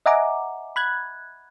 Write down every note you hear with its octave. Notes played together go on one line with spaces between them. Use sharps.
D#5 E5 F#5 G#5 A#5 D6
B5 F#6 G#6